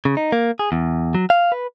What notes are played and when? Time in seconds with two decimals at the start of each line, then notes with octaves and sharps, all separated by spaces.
0.05 C#3
0.17 D#4
0.32 A#3
0.59 G#4
0.72 E2
1.15 F#3
1.30 F5
1.52 B4